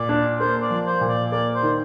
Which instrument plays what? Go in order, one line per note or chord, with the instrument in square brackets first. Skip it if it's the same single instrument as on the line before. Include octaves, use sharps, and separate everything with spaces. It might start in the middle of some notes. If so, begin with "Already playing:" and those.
Already playing: [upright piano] A#2 [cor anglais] D5
[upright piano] D4
[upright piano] A#3 [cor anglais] C5
[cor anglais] D5
[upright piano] F3
[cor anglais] C5
[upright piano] A#2
[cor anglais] D5
[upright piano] A#3 [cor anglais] D5
[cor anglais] C5
[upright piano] D#3